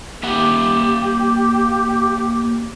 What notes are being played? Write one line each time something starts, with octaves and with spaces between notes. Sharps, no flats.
A#3 G4 E5 F#5